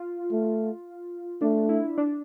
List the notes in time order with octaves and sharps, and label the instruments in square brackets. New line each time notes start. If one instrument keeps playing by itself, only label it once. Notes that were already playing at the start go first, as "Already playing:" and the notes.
Already playing: [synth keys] F4
[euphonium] A3
[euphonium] A3 [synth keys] D4
[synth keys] E4
D4